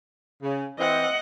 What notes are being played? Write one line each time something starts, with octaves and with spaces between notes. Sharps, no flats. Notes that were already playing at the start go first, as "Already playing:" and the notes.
C#3
E3 C4 D#5 F#5